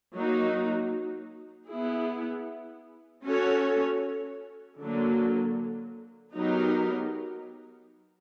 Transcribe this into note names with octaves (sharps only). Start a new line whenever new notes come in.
F#3 A#3 D#4 F#4
B3 E4 G#4
C#4 F#4 A4 C#5
D3 F#3 A#3
F#3 B3 D#4 G4 A#4